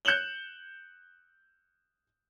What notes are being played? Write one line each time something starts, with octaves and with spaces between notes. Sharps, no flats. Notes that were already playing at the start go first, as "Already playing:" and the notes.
F#6 G6 C#7 E7 F#7 G7